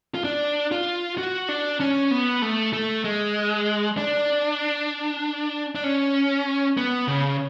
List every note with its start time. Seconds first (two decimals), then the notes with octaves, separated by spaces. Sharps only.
0.15 F4
0.24 D4
0.72 F4
1.18 F#4
1.49 D4
1.80 C#4
2.11 B3
2.42 A3
2.73 A3
3.04 G#3
3.97 D4
5.75 D4
5.84 C#4
6.77 B3
7.08 C#3